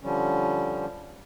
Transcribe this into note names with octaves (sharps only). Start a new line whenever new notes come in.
D3 F3 G3 C#4